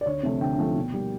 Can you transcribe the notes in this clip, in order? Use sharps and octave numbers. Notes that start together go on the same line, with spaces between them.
D5
D2 C#5
C3 F3 A3
D2 G5
C3 F3 A3
B2
G3 A#3